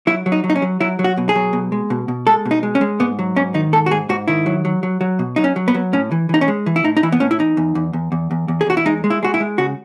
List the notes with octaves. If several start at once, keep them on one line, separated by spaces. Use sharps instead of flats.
F#3 E4
F#3
D#4
F#3
D#4
C#4
F#3
F#3 E4
F#3
F#4
B2
G#4
F#3
B2
G#3
B2
B2
G#3 A4
B2
D#4
G#3
C#4
G#3
G#2 B3
F#3
G#2 C#4
D#3 D#4
G#2 A4
F#4
G#2 G#4
G#2 F#4
D#3 E4
F#3
F#3
F#3
F#3
B2
F#3 D#4
C#4
F#3
B3
F#3
A2 C#4
E3
E3 D#4
C#4
G#3
E3
E4
A2 D#4
D#4
E3 E4
B3
A2 C#4
E4
E2 D#4
E2
E2
E2
E2
E2
E2
G#4
E2 F#4
E4
G#3 D#4
G#3
E4
G#3 F#4
E4
G#3
C#3 F#4